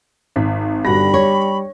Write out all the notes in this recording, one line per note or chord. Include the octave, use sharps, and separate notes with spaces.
G#1 B6
G1 G3 F#4 B5 A#6
C#5 C#6